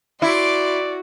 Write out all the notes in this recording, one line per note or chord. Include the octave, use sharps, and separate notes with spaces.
E4 F#4 D5 C6 D6